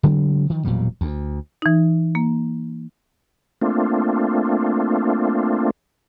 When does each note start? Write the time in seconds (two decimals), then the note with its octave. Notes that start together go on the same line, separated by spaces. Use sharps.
0.03 C#3 F#3 G#3 C4
0.50 D#3 F3
0.65 E1 A#2 F#3 G3
1.01 D2
1.62 E3 D#4
2.15 A#3
3.62 A3 A#3 C4 D4 F4